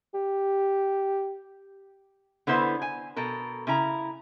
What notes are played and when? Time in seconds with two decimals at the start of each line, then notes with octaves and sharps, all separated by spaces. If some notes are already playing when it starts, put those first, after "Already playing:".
0.14 G4
2.47 D3 B3 E4 C5
2.82 G#5
3.16 B2 A4 A#4
3.67 C#3 E4 A#5